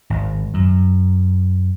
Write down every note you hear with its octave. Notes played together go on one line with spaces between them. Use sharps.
G#1
F#2